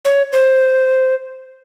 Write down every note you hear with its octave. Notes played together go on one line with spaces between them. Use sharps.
C#5
C5